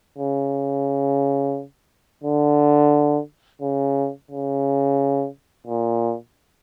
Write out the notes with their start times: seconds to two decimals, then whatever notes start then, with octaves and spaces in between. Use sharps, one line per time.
0.18 C#3
2.24 D3
3.61 C#3
4.31 C#3
5.67 A#2